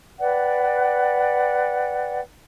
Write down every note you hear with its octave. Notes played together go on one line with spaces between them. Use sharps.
B4 D5 F#5 G5